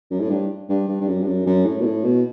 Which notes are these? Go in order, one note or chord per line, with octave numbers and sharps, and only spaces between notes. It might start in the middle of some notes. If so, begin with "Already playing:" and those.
F#2
A2
G2
G2
G2
G2
F#2
G2
F#2
F#2
A2
B2
A2
B2